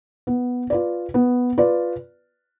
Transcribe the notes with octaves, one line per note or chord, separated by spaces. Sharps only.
B3
F4 B4 D5
B3
F4 B4 D5